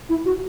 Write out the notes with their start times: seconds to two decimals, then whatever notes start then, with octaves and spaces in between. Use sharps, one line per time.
0.09 E4
0.26 F#4